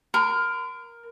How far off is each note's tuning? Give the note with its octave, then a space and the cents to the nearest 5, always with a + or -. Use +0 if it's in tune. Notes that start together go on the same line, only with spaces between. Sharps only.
A#4 +10 C6 -45